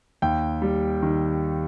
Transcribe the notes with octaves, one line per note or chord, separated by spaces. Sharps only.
D#2 G5
G3
D#3